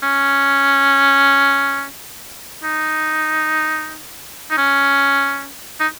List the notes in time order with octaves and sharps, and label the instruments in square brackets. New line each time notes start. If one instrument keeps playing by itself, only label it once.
[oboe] C#4
D#4
D#4
C#4
D#4